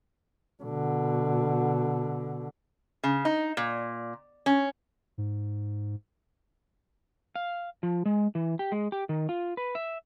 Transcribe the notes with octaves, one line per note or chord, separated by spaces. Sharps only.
B2 D3
C#3
D#4
A#2
C#4
G#2
F5
F3
G#3
E3
G4
G#3
G4
D#3
F4
B4
E5